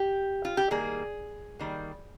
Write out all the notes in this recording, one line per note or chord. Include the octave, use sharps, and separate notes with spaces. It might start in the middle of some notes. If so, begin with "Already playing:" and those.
Already playing: G4
F4
G4
D#3 G3 A#3 G#4
D#3 G3 A#3